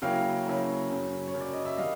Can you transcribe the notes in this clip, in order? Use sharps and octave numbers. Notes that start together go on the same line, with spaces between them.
C#3 F#3 A#3 C#4 E4 F5 G5
C#3 F#3 A#3 C#4 E4
F#2 C#3 F#3
C#5
F#2 C#3 F#3
D5
D#5
E5
D#3 G3 D#5 F5